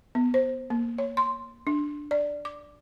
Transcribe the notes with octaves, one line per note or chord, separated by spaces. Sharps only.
B3
C5
A#3
C#5
C6
D4
D5
D6